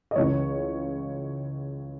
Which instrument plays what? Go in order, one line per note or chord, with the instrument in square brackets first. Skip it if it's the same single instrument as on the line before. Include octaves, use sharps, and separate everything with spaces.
[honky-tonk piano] D#5
C#2 C#3 E3 C#5